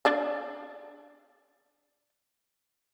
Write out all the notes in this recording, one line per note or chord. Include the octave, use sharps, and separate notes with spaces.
D4 D5 A5